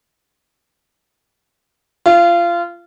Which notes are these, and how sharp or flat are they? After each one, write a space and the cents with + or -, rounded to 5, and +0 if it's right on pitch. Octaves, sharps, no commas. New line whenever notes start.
F4 -25